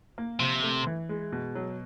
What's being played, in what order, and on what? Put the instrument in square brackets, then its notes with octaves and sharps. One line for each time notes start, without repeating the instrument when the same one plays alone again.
[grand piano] A#3
[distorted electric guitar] C3 [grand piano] F3
[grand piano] A3
E3
G#3
B2
F#3